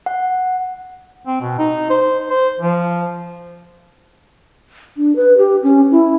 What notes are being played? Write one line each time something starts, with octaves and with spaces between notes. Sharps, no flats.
F#5
C4
B2
D#4
C5
C5
F3
D4
B4
G4
C#4
E4